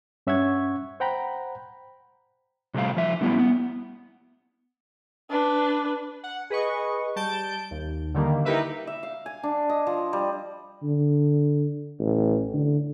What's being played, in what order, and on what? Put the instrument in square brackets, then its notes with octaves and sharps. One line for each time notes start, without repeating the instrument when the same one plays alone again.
[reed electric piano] G2 C#4 E5 F#5 C#6 G#6
C5 F#5 G5 A#5 B5
[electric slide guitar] C3 G3 A3 F5
F3 E5
D3 G3 B3 E4
B3
[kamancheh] D4 B4
[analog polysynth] F#5
G#4 B4 D#5 C#6
G3 A5 G6 D7
D#2
D3 D#3 G3 A#3
D#4 E4 G4 A#4 B4 E5
[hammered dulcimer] E5
F5
G#5
D4
D#5
F3
G3
[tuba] D3
A1
D3